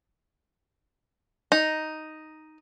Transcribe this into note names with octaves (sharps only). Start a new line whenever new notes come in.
D#4